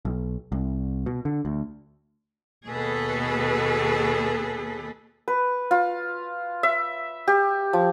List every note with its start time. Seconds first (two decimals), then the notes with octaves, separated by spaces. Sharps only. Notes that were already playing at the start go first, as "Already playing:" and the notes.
0.05 B1
0.52 C2
1.06 B2
1.25 D3
1.45 D2
2.67 D#2 B2 G#4 A4 B4
5.28 B4
5.71 F4
6.63 E5
7.28 G4
7.73 F3